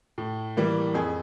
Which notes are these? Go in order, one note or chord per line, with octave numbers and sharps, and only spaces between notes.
A2
E3 G3 A#3
F2 G#4